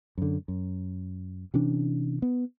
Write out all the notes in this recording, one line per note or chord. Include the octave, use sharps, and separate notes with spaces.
F#2 D3
F#2
C3 E3 C#4 D4
B3